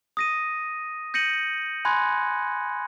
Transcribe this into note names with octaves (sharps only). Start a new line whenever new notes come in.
D#6 A#6 D#7
G6 A#6 C#7 D#7 F#7
G#5 B5 C6 F#6 G#6